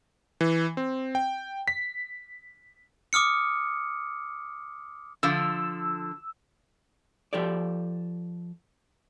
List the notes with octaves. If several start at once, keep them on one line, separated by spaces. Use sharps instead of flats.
E3
C4
G5
B6
D6 D#6 F6 C#7
D3 F3 E6
F3 G4 A4 D5